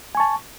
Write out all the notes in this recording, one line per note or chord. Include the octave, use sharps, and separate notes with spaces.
G#5 A5 C#6